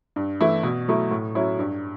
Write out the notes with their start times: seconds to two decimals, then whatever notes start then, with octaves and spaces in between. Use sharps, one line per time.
0.16 G2
0.40 E3 A3 E4
0.63 B2
0.88 F#3 A3 E4
1.11 A2
1.35 F#3 C#4 E4
1.59 G2